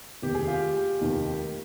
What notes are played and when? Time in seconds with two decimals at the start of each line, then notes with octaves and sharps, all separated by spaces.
0.22 F1 D#2 D#3 G4
0.35 G#4
0.47 F4 G4
1.01 F1 D#2 D#3